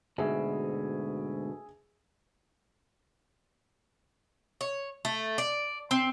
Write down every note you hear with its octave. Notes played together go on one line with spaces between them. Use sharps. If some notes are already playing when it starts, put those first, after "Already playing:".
D2 G#2 B2 G#4 E5
C#5
A3
D5
C4